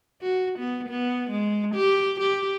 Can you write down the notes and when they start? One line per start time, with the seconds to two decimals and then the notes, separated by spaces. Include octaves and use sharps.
0.23 F#4
0.59 B3
0.90 B3
1.31 G#3
1.76 G4
2.21 G4